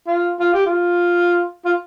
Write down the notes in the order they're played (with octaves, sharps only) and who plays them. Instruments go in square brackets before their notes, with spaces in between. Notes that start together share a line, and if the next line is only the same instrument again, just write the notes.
[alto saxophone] F4
F4
G4
F4
F4